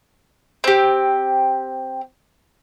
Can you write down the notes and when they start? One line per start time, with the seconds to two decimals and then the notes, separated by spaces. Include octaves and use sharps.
0.64 C4 G4